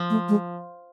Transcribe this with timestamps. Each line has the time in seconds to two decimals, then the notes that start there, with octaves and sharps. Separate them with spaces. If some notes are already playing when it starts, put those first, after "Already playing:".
Already playing: F3
0.10 A3
0.29 G#3